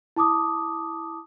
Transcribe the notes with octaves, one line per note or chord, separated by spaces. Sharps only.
E4 A5 D6 D#6